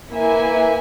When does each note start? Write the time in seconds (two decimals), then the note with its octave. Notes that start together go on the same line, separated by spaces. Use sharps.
0.12 A#3 E4 B4 E5 G#5